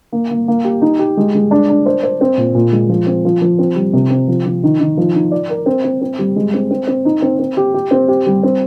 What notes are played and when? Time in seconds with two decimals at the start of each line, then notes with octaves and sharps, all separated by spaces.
0.12 A#3
0.31 A#3
0.48 A#3
0.65 G4
0.82 D#4
0.99 G4
1.17 G#3
1.35 G#3
1.51 D4
1.69 D4
1.86 C5
2.03 C5
2.21 C4
2.37 A#2
2.55 A#2
2.72 G#3
2.89 F3
3.07 C4
3.25 F3
3.42 F3
3.59 C4
3.76 G3
3.94 C3
4.10 C4
4.28 F3
4.45 F3
4.63 D#3
4.80 D#3
4.97 F3
5.15 D#4
5.32 D5
5.49 A#4
5.66 C4
5.84 C4
6.01 C4
6.19 G3
6.36 G#3
6.54 C4
6.71 C4
6.87 C4
7.05 D#4
7.22 C4
7.39 C4
7.57 G4
7.74 G4
7.91 C4
8.08 G4
8.26 G3
8.43 C4